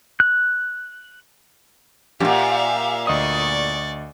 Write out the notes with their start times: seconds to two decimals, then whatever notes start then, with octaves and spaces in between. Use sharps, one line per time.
0.20 F#6
2.20 F#2 A#2 G4 E5 F5
3.07 D2 D5 D#5 C#6 D#6